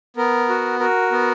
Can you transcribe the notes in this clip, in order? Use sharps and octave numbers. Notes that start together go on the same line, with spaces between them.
B3 A#4
F#4
F#4 A#4
B3